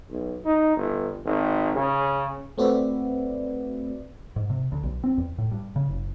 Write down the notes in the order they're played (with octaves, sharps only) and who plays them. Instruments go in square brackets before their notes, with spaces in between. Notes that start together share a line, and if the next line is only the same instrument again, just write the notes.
[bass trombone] B1
D#4
G1
G#1
C#3
[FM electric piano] A3 C4 F#4 B4 D5 E5
[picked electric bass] G#2
C3
D2
B1
C4
E2
A2
G2
C#3
F#1